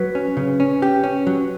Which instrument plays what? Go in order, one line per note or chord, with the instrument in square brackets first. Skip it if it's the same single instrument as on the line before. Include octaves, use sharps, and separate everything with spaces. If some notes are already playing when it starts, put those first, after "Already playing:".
Already playing: [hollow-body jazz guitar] F#3 [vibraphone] B4
[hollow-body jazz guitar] C#4
C#3
C#4
G4
C#4
F#3